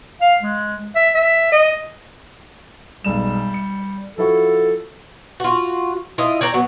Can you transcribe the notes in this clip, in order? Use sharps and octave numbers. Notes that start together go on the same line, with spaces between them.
F5
G#3
E5
E5
D#5
B1 G3 G#3 E7
C#7
F3 E4 F#4 A4
F4 F#4
E4 F4 D#5
C#5 D5 G5 A#5
F#3 B3